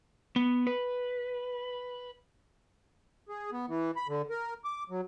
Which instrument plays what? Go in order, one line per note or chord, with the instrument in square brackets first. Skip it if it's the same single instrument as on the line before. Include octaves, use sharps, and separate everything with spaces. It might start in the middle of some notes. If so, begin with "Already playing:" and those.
[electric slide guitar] B3
B4
[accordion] G#4
B3
E3
B5
D3
A#4
D6
F#3